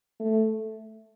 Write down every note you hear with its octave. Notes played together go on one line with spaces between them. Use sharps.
A3